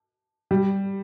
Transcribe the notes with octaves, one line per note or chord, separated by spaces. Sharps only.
G3